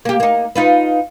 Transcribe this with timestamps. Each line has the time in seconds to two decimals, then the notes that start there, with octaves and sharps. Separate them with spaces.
0.05 A#3 G4
0.20 A#3 D#4
0.56 D#4 F4 B4